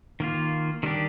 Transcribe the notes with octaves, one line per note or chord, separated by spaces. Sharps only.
D#3 A#3 F4
D#3 G3 D4 G4